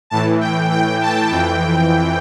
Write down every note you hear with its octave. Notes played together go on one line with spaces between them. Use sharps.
A2 E3 A5
G5
G5
A5
F2 E3 G5